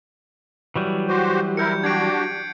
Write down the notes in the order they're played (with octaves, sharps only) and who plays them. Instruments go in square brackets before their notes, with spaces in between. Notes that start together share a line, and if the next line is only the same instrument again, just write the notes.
[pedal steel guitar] E3 F#3 G3
[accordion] F#4 G4 C5
[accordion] E4 A#4 [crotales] G6 C#7
[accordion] D4 F#4 G4 [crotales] G#6 C7 D7